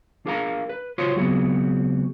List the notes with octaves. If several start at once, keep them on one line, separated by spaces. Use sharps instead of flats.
D4 G#4 A#4 F5 A5 A#5
B4
C#2 F4 F#4 C5 C#5 C6
C#2 F#3 B3 C4 F#4 G#4